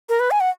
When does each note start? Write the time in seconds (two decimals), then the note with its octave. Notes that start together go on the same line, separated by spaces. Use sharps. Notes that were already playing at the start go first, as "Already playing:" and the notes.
0.09 A#4
0.20 B4
0.31 G#5
0.40 F#5